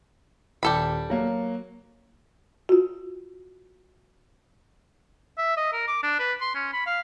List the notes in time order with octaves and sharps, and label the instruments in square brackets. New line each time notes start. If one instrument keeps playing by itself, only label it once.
[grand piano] D#1 [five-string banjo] G3 A4 B5
[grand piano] F#3 A#3
[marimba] F4 F#4
[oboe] E5
D#5
A#4
D6
D4
B4
C6
C#4
B5
F5